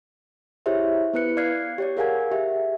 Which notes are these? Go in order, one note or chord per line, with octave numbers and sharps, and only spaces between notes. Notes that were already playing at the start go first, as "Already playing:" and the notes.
E4 G4 G#4 C5 C#5 E5
B3 E4 B4 F#6 C#7
D5 F5 F6 F#6 G#6 C7
G4 C#5 D5
G#4 A#4 F5 F#5 G#5 G#6
G4 G#4 E5